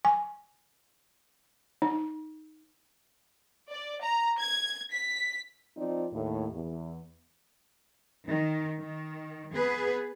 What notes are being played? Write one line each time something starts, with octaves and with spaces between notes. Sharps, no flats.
G#5
D#4
D5
A#5
G#6
B6
F3 C4 D#4 F4 D5
D#2 A2
E2
D#3
D#3
B3 G#4 B4